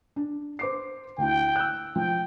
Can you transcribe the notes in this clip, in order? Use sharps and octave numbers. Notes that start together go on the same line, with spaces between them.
D4
C5 D6 C7
D2 E4 G5
E6 F#6
F3 G5